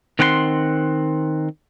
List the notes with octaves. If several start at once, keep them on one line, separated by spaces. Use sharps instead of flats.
D#3 C4 F#5 G5 C6